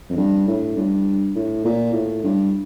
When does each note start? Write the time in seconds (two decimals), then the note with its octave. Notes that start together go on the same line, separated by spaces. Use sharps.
0.10 F2
0.17 G2
0.47 A2
0.76 G2
1.35 A2
1.65 A#2
1.93 A2
2.24 G2